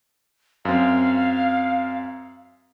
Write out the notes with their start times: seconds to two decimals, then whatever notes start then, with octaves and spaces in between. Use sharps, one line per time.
0.65 F#2 C4 F5